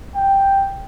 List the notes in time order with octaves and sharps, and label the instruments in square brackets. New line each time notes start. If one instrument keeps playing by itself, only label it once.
[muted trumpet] G5